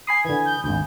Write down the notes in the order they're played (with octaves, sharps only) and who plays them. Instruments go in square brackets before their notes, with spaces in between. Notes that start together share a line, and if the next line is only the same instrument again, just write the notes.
[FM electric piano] G#5 B5 D#6 [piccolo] C7
[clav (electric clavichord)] D3 E3 [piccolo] G#6
[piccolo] G6
[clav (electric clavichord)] G#1 D2 [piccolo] G6